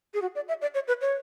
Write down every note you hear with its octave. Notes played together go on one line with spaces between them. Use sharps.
G#4
F#4
D5
E5
D5
C#5
B4
C#5